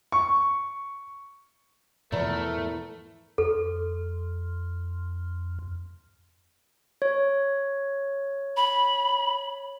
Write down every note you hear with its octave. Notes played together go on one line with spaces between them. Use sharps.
C#6
E2 G#2 B2 F3 A3 A#4
F2 A4
C#5
B5